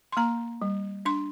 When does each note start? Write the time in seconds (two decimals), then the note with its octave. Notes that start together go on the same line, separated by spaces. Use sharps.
0.12 C6
0.17 A#3 A#5
0.62 G3
1.05 D4 C6